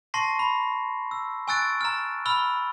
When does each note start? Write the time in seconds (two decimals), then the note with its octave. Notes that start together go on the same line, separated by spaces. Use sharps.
0.14 A5 C6 C#6 A#6 C7
0.39 B5
1.11 E6
1.48 G#5 C#6 E6 F#6 A6 D7
1.81 A#5 F6
2.26 B5 E6 F6 G7